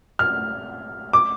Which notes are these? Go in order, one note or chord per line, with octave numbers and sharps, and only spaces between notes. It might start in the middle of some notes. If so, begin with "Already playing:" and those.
F6
D6